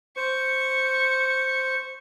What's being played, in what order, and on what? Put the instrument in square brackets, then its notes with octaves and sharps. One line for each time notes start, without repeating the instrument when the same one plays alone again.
[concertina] C5 [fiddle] C#6